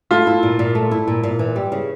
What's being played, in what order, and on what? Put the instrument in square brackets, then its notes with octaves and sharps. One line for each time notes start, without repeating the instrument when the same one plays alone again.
[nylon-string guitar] A3 [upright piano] F4
[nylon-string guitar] E4
A#2
A#2
A3
E4
A#2
A#2
E3
G3
C#3